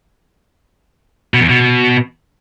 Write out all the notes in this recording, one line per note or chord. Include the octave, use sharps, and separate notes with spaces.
B2
E2
B2